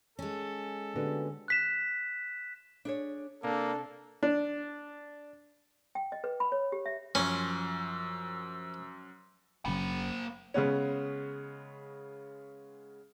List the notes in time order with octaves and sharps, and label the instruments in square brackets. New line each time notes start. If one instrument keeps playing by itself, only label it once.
[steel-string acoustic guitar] G#3 C#4 [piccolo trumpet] A4
[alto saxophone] D3 [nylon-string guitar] B3 F#4 G4
[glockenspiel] F#6 B6 E7
[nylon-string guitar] D4 G#4 C#5
[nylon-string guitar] C3 [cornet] A#3 [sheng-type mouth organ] D4 [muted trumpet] A4
[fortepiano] D4
[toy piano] G5
D#5
B4
B5
C#5
G4
E5
[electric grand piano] F#2 [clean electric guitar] F3 [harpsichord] C#4 [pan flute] E6
[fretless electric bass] F#1 C#3 F#3 [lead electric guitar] A#3 B5
[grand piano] C#3 G#3 B3 C#4